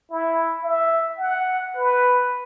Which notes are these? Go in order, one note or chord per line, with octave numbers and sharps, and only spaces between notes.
E4
E5
F#5
B4